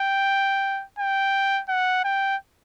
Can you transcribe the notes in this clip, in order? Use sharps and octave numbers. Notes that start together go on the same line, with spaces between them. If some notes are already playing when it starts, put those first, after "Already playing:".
Already playing: G5
G5
F#5
G5